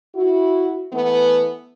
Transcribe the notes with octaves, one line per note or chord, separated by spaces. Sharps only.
E4 F#4
E3 A3 B3